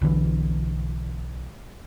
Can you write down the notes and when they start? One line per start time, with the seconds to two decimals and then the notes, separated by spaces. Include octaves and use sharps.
0.02 B1 D3 E3